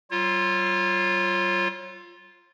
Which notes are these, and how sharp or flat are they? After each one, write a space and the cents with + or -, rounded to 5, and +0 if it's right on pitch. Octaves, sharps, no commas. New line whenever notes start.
G3 -45 F4 +0 C#5 -35